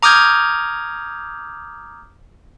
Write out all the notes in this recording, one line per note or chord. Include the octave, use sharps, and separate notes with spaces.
A#5 D6 D#6 F6 G6 G#6